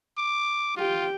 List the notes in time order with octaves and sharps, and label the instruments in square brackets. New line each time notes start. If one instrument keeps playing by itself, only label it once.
[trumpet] D6
[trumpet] F4 [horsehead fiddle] G4 G5